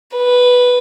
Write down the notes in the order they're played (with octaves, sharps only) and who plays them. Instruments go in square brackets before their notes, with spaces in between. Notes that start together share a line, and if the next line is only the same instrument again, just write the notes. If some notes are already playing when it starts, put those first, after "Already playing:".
[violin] B4